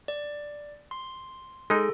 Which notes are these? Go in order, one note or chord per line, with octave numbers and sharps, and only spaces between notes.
D5
C6
G#3 D#4 G#4 A4